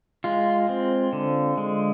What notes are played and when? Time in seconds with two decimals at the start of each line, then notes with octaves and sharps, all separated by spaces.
0.24 G#3 F4
0.69 C4
1.13 D3
1.58 G#3